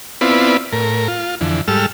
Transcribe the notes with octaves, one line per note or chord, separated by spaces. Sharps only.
B3 C4 E4 F4 B4 D5
A2 A#4
F4
F2 D3 E3
G#2 G3 A4 E6 F6